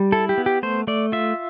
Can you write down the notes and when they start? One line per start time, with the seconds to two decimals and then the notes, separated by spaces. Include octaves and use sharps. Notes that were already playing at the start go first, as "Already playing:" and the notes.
Already playing: G3
0.12 E4 A4
0.29 G4
0.38 B3
0.46 G4
0.63 A3 C5
0.87 A3 D5
1.12 F4 E5